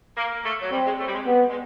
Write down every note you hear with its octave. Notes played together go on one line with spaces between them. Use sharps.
A#3
A3
F#3
G3 C4
G#3
A3
G3
G#3
G3 B3
G#3